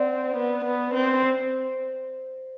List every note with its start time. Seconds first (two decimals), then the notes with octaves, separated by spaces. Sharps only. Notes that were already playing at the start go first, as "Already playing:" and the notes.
Already playing: C4 D5 F#5
0.37 B3
0.65 B3
0.94 C4
1.22 C5